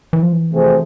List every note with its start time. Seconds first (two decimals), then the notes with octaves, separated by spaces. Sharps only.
0.13 E3
0.23 F3
0.33 E3
0.51 C3 F3 A3 C4 G#4